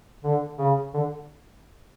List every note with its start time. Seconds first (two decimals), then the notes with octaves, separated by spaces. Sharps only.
0.24 D3
0.58 C#3
0.94 D3